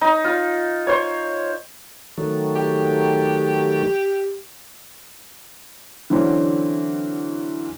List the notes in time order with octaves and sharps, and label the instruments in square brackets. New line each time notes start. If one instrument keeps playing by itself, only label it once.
[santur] D#4
F4
C5 C#5
[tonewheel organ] D#3 F#3 A3
[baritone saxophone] G4
[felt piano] D3 E3 F#3 C4 C#4